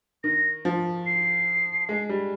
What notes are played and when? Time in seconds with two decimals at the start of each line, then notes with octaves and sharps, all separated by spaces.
0.24 D#3 A#6
0.65 F3
1.06 C7
1.89 G#3
2.09 G3